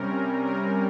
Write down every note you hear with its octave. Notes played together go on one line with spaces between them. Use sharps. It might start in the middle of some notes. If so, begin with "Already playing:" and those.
Already playing: C3 G3 C#4 A#4
A#4